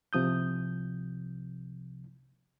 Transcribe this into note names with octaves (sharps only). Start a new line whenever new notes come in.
C2 C3 F3 D#6 G6